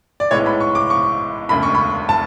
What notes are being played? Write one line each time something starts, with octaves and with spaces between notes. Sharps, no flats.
D5
B1 A2 G#3 B3 C#5
B5
C#6
D6
C#6
E1 D2 C#3 B5
C#6
B5
A5